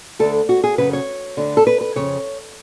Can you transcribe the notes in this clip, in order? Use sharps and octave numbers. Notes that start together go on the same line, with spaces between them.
D2 D3 A4
F#4
G#4
F#2 C#3 B4
C#5
D2 D3
A4
B4
B4
F2 C#3 C#5